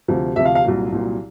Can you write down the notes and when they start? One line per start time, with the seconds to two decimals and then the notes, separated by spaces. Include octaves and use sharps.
0.08 D2 C3 F3
0.36 D2 C3 F3 E5
0.45 F5
0.55 F5
0.65 C2 A#2 F#3
0.92 C2 A#2 F#3